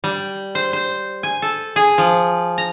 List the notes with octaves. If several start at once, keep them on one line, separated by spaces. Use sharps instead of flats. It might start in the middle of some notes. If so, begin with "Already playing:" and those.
G3
C5
C5
G#5
A4
G#4
F3
A#5